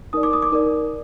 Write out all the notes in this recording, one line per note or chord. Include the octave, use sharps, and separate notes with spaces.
D#4 A#4 D5 D#6
D6
D#6
D6
D#4 A#4 D5